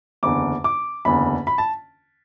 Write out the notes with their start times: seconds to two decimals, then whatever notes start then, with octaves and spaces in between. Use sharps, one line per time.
0.23 F#1 E2 D3 D6
0.64 D6
1.05 F#1 E2 D3 B5
1.47 B5
1.58 A5